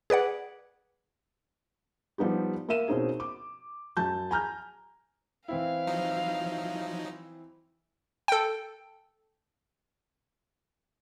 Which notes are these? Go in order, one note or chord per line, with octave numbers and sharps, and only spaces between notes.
G#4 B4 D5 F#5
F3 G3 B3 D#4 G4
A#3 A#4 E5 D#7 E7
B2 C4 C#4 D#4 G#4
D6
F#2 F#3 A5 G6
G#5 A#5 F6 G6
E3 C4 E4 F5
F3 F#3 D#4
A4 G5